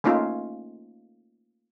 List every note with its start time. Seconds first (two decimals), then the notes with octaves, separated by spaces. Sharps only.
0.04 A3 A#3 C#4 D#4 F4